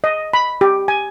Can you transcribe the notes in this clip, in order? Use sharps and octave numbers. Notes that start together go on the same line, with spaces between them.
D#5
B5
G4
G#5